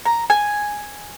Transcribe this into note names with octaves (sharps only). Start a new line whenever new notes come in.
A#5
G#5